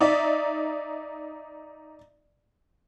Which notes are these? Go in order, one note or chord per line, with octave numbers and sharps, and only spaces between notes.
D#4 D5 E5